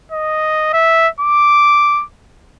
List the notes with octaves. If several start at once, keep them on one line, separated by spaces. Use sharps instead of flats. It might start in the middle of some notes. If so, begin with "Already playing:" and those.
D#5
E5
D6